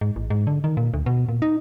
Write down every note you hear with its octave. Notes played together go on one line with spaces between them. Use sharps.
G#2
A1
G#2
D3
D#3
A#2
D2
B2
A#2
D#4